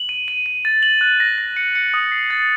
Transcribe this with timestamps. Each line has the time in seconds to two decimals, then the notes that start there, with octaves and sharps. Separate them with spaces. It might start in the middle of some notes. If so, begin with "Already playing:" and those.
Already playing: F#7
0.09 D#7
0.28 D#7
0.46 D#7
0.65 A6
0.83 F#7
1.01 F#6
1.20 A#6
1.38 A#6
1.56 C#7
1.75 C#7
1.94 D#6
2.12 C7
2.30 A6